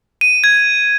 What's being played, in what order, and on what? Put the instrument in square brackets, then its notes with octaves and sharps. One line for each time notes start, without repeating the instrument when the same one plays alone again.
[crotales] D#7
G#6